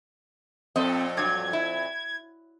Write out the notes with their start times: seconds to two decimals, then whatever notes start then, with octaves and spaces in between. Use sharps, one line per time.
0.76 F2 A#2 C4 A4 D#5
1.17 G2 F#3 G#6
1.53 E4